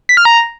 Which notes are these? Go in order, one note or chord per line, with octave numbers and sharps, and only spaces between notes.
B6
F6
A#5